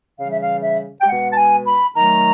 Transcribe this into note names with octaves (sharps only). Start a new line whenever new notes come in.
C#3 E3 G3 F5
E5
F5
E5
G5
B2 G#3 F#5
A5
G#5
B5
D#3 F#3 A3 A#5